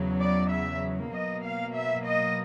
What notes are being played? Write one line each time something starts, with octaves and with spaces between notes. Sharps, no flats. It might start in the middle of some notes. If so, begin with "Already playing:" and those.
Already playing: E2 C#3 F#3
D5
E5
B2 F#3 A#3 D#5
F5
E5
D#5